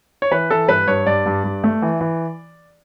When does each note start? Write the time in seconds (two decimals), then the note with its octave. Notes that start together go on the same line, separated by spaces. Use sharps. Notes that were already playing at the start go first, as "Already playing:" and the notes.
0.22 C#5
0.31 E3 B4
0.51 E3 A4
0.68 G2 B4
0.87 G2 C#5
1.06 G2 D5
1.26 G2
1.44 G2
1.64 A3
1.82 E3
2.01 E3